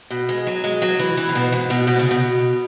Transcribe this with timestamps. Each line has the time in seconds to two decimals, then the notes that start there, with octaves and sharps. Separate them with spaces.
0.11 B2
0.29 G#3
0.47 F#3
0.64 G#3
0.82 F#3
0.99 E3
1.17 E3
1.29 C#3
1.35 B2
1.52 G#2
1.70 B2
1.87 B2
1.99 C#3
2.11 B2